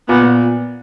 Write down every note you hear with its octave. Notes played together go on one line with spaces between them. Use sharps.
A#2 B3